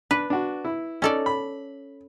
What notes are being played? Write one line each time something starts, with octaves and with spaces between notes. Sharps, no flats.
D4 B4
D4 F#4
E4
C#4 D#4 A4 D5
B5